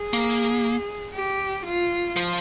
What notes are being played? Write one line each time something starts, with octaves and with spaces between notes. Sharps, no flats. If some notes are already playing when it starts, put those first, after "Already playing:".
Already playing: G#4
A#3
G4
F4
F3